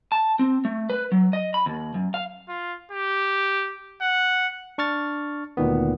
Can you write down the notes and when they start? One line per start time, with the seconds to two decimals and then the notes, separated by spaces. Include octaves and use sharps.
0.12 A5
0.39 C4
0.65 A3
0.90 B4
1.12 F#3
1.33 D#5
1.54 B5
1.66 D#2
1.94 F#2
2.14 F5
2.48 F4
2.92 G4
4.02 F#5
4.78 D4 C#6 F6 A6
5.57 D2 A#2 D#3 B3